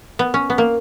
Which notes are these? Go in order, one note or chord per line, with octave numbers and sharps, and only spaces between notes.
B3
C#4
B3
A#3